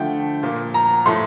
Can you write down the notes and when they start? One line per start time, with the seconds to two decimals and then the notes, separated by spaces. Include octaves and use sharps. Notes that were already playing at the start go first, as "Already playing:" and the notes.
Already playing: D3 F3 A3 G5
0.43 A#2 F3 A#3
0.74 A#5
1.06 A2 F3 A3 C6